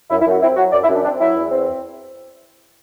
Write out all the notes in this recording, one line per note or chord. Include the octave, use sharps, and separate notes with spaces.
F#2 E4
E4
F#2
F#4
C4 E4
F#3 F#4
F#2 D5
E4
F#2
D4
C4 D4
F#3 E4
E2
C4